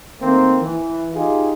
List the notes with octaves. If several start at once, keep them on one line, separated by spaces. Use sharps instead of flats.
D#3 A3 A#3 C4
E3
D#4 F4 G4 G#4